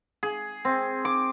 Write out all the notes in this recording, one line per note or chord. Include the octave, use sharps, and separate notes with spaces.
G#4
C4
D6